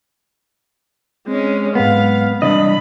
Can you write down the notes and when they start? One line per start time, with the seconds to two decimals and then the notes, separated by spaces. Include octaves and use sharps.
1.28 G#3 C4 C#4
1.75 G#2 F#3 G#3 B3 F5
2.42 G2 C3 E3 D4 D5 D#5 B5